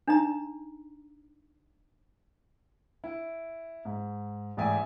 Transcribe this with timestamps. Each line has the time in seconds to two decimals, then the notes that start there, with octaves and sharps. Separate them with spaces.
0.08 D4 D#4 E5 A#5
3.04 E4
3.85 G#2
4.57 A1 G#2 D5 E5 G#5